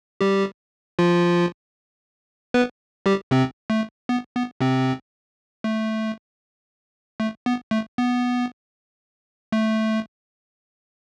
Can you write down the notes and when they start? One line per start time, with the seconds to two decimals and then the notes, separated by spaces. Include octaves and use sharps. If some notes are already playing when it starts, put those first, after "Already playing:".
0.21 G3 G4
0.99 F3 F4
2.54 B3 B4
3.06 G3 G4
3.31 C3 C4
3.70 A3
4.09 B3
4.35 B3
4.61 C3 C4
5.64 A3
7.20 A3
7.46 B3
7.71 A3
7.98 B3
9.52 A3